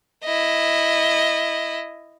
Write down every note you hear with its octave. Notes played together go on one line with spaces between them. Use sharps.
E4 D#5